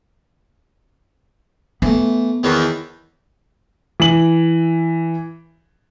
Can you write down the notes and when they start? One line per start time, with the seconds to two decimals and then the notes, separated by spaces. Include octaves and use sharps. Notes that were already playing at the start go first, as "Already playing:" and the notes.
1.82 E3 A3 B3
2.43 E2 D#3 D#4 C#5
4.00 E3 F#7